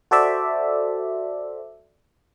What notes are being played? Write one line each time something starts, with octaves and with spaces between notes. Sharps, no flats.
F#4 A4 C5 D5 E5